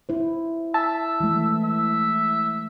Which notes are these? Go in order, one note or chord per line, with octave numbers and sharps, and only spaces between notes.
E4 C5
E5 A5
E3 G#3 A3
E5